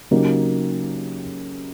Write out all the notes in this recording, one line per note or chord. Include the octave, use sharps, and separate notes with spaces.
C#3 F#3 A#3 D#4 G4